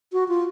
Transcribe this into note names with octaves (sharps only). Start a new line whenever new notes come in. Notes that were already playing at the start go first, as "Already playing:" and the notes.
F#4
F4